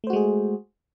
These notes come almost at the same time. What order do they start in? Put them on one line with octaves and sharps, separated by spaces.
A3 C5 F#4 G#3 G#4